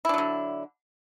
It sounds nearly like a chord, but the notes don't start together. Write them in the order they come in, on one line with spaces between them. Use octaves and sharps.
E4 D4 F#3 D3